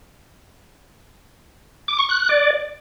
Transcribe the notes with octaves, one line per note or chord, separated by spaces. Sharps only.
D6
C#6
F#6
F#6
D5